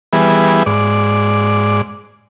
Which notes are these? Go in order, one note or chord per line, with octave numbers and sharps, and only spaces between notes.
E3 G3 B3 G#4
G#2 D5